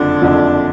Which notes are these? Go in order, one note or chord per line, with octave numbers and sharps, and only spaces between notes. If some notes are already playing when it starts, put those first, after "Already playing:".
Already playing: F#1 F2 D3 F3 D4
F#1 F2 D3 F3